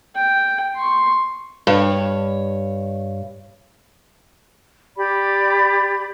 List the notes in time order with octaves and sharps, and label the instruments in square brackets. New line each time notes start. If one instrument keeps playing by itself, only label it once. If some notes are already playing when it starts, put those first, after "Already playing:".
[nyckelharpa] G5
C6 C#6
[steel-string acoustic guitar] G2 C#5
[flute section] G4 D5 B5